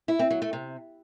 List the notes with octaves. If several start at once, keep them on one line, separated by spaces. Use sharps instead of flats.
E4
C4
F#3
A3
C3